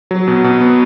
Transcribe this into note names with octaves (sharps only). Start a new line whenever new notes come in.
F#3
B2
B2
B3